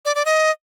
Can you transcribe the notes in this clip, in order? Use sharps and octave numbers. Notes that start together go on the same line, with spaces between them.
D5
D5
D#5